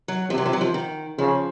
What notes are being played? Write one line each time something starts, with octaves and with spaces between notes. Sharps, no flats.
F#3
C3 F3
F#3
F3
F#3
F3
D#3
C#3 F3